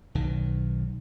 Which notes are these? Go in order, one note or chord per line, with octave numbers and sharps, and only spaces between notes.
B1 D#3